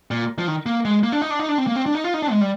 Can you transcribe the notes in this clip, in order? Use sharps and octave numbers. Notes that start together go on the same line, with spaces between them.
A#2
F3
D#3
A#3
G#3
A#3
D4
D#4
D4
D#4
D4
C4
A#3
C4
D4
D#4
F4
D#4
D4
G#3
G3